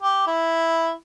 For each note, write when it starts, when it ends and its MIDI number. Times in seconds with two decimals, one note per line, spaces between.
0.02 0.27 67
0.27 0.90 64